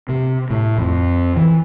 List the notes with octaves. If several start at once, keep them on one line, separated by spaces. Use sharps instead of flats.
C3
A2
F2
E3